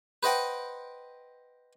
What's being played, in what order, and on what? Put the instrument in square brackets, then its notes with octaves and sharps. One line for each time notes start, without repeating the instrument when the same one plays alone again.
[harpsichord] B4 C5 D#5 F#5 G5